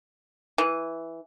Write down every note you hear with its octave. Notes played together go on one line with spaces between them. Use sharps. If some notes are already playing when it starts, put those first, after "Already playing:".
E3